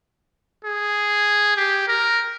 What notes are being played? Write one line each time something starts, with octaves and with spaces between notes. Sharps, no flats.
G#4
G4
A#4